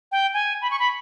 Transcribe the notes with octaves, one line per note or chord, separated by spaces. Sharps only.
G5
G#5
B5
C#6
B5